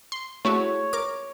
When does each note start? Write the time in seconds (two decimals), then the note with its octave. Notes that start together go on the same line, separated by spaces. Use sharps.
0.12 C6
0.45 A3 E4 F#4 C#5
0.93 A#4 D6